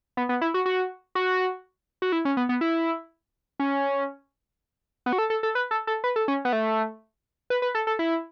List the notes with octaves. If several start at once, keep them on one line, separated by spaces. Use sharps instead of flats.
B3
B3
E4
F#4
F#4
F#4
F#4
E4
C#4
B3
B3
E4
C#4
B3
F#4
A4
A4
A4
B4
A4
A4
B4
A4
C#4
B3
A3
B4
B4
A4
A4
E4